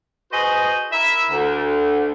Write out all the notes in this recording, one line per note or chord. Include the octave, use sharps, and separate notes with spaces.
F#4 G#4 B4 C5 D#5
E4 A#4 E5
D2